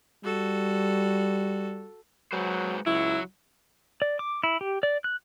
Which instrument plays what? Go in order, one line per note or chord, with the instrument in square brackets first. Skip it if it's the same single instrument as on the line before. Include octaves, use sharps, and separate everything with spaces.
[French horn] G3 [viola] F#4 A4
[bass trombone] F#3 [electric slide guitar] G#3 B4 C5
[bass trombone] C#2 [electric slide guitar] F#3 [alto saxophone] E4
[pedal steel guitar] D5
D6
E4
G4
D5
F#6